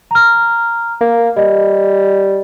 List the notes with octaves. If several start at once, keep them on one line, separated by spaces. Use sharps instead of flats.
A#5 F6
A#3
G3 D#5